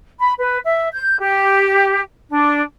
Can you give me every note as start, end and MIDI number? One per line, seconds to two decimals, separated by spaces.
0.20 0.33 83
0.39 0.58 71
0.65 0.88 76
0.93 1.18 91
1.19 2.02 67
2.30 2.60 62